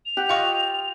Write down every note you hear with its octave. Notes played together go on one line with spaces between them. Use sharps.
F7
G4 F#5
F4 D#5 F5 G5 C#6